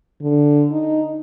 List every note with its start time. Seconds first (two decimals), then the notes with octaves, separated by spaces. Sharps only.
0.22 D3
0.72 D#4